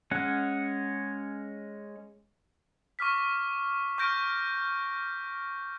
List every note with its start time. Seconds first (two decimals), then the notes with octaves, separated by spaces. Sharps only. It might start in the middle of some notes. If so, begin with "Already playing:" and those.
0.11 G#3 C#4 F#5
2.99 C#6 D6 F6 B6
3.98 C#6 F6 G6 A#6 D7